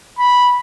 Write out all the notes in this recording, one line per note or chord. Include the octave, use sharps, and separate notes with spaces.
B5